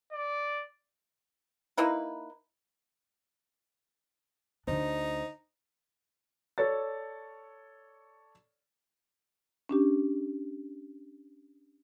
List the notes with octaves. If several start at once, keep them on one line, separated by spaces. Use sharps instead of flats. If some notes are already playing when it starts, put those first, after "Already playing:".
D5
A#3 D#4 E4 B4
D2 D3 D4 D#4 C5
A4 C#5 D5 A6
C#4 D4 G4